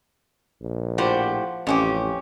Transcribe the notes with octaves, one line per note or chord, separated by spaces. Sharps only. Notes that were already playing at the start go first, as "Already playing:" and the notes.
A#1
A2 F3 G4 C5 F#5
A1 F2 C#4 G4